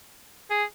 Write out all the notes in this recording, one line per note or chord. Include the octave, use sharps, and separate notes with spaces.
G#4